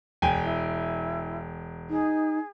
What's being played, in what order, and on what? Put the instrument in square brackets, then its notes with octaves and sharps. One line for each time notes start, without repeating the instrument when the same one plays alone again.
[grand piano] E1 G5 G#5
[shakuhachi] E4
[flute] D#4 [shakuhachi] G#4